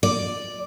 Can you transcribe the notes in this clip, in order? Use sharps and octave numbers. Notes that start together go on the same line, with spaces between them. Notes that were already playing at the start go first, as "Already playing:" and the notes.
D5